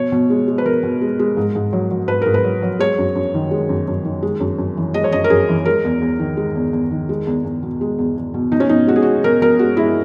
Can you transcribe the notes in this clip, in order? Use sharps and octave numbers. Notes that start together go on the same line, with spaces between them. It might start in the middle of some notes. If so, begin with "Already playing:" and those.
Already playing: B2 C#5
B2
G#3
G#3
B4
B2 A#4
B2
G#3
G#3
G#2
G#2
F#3
F#3
G#2 B4
G#2 A#4
B4
F#3
F#3
G#3 C#5
F#2
F#2
D#3
G#3
F#2
F#2
D#3
G#3
F#2
F#2
E3
G#3 D#5
C#5
F#2 D#5
A#4
F#2 G#4
E3
G#3 A#4
E2
E2
D#3
G#3
E2
E2
D#3
G#3
E2
E2
B2
G#3
E2
E2
B2
B2 D#4
C#4
B2 D#4
G#3 F#4
G#4
G#3 F#4
B2 A#4
B2 A#4
G#3 F#4
G#3 E4